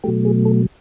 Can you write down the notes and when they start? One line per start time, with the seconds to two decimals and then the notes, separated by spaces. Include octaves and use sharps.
0.04 B2 F#3 A3 G4
0.25 G#4
0.45 A4